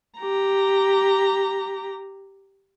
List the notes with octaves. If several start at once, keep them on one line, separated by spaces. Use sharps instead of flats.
G4 A#5